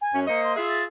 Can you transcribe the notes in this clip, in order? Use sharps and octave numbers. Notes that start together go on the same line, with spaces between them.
G#5
F#2 C#4
A#3 C5 D#5 C#7
C6
F4 G#4 E5 C7
A6